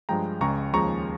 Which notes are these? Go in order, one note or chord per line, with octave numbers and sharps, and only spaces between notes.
G2 F3 G#3 G5 A#5
C#2 C#3 G#3 A#5 C#6
D#2 C#3 F3 G#3 A#5 C#6